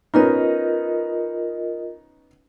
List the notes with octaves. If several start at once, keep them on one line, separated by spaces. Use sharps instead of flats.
B3 C#4 D#4 F4 A#4 D#5